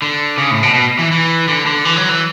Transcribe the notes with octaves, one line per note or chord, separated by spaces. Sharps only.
D3
C#3
A2
B2
B2
E3
E3
D3
D3
E3
F#3
E3